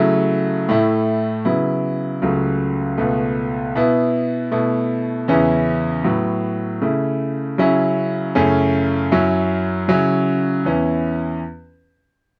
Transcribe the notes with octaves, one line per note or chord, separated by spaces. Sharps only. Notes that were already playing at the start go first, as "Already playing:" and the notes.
Already playing: C#3 F#3 A3 E4
A2 A3 E4
C#3 F#3 B3 E4
C#2 C#3 F#3 A3
C#2 B2 A3
B2 B3 E4
B2 A3 E4
E2 C#3 E3 C#4 E4
A2 F#3 B3
C#3 A3 E4
C#3 F#3 C#4 E4
F#2 C#3 A3 C#4 E4
F#2 F#3 C#4 E4
C#3 F#3 C#4 E4
E2 E3 C#4 E4